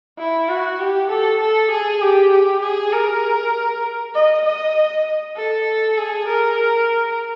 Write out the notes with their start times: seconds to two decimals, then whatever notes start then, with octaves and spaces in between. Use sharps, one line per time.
0.19 E4
0.49 F#4
0.80 G4
1.10 A4
1.41 A4
1.71 G#4
2.01 G4
2.32 G4
2.63 G#4
2.93 A#4
4.15 D#5
4.45 D#5
5.36 A4
5.98 G#4
6.28 A#4